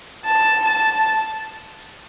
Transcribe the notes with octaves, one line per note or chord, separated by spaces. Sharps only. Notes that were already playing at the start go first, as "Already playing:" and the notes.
A5
A5